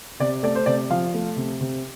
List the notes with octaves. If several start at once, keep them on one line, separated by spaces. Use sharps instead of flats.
C3 D5
A3 D5
C5
C3 D5
F3 F5
A3
C3
C3